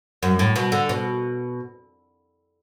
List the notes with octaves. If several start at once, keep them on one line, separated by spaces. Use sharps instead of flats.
F#2
A2
B2
D3
B2